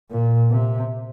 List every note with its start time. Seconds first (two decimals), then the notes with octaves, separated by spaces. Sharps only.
0.11 A#2
0.51 C3